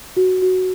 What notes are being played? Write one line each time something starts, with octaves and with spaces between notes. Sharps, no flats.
F#4
F#4